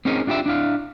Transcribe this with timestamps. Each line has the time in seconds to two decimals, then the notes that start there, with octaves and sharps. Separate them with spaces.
0.05 C4 C#4 D#4 G#4 A#4
0.27 D4 F4 G4 C#5 E5
0.46 D4 E4 F5